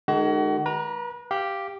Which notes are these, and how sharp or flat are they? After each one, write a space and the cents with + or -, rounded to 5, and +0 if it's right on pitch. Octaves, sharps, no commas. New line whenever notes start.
D#3 -35 G#3 +15 F#4 +35
B4 -35 A#5 +0
G4 +0 F5 -15